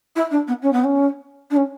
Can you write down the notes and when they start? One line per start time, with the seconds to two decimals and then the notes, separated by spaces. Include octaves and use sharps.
0.16 E4
0.31 D4
0.47 B3
0.62 C#4
0.72 B3
0.84 C#4
1.50 D4
1.56 C#4